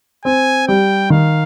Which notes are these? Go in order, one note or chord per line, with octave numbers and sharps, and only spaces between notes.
C4 G#5
G3 G5
D#3 F5